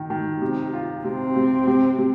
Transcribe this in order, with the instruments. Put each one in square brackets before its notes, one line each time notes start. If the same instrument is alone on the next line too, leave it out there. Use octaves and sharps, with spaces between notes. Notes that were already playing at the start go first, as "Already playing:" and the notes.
Already playing: [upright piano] D#3
D#3
C3
F4
[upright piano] C3 [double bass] C4
[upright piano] C3
C3
C3